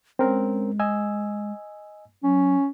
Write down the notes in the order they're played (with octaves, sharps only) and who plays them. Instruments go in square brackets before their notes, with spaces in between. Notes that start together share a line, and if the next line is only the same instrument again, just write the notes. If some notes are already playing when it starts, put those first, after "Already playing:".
[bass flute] G#3 [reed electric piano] C4 C#4 A#4
[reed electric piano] D#5 G#5 E6
[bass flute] F#3 [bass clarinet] C#4